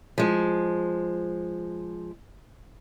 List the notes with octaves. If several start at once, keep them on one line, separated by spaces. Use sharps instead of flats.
F3 G#3